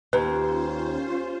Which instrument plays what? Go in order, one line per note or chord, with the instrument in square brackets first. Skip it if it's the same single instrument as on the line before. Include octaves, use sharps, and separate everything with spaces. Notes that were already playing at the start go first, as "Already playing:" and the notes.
[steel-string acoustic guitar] D#2 [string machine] C#4 F4 C5 [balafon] B4